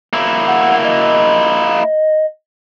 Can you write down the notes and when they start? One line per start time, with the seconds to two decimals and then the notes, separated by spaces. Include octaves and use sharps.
0.13 A#3 E4
0.48 F#5
0.85 D#5